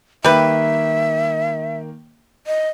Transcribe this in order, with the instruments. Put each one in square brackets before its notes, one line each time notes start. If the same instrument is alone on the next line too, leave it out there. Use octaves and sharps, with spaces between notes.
[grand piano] D#3 A#3 G5 [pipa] G3 B4 [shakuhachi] E5
[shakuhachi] D#5